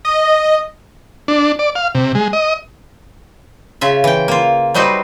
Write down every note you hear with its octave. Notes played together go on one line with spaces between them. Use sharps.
D#5
D4
D5
F5
C3
G#3
D#5
C#3 F4 E5
E3 G5
A#3 F4
F#3 G3 D#4 F#4 B4 C5